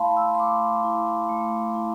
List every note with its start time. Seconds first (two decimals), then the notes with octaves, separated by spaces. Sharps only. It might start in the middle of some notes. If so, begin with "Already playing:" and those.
Already playing: A3 E4 F5 A5 B5 C6
0.17 E6
0.35 C6
0.39 A3 D6
0.84 E4
1.29 A3
1.75 E4